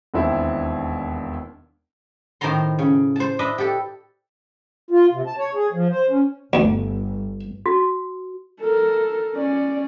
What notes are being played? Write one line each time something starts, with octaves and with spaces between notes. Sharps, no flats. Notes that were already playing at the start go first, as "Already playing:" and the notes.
E1 D#2 C4 D4 E4
A2 D#3 C5 A5 A#5 C6
C#3
C5 A5
D4 B4 D#5 E5
G4 A4
F4
C3
A5
C#5
G#4
F3
C5
C#4
G1 D2
F#4
A4 A#4
C#4 D5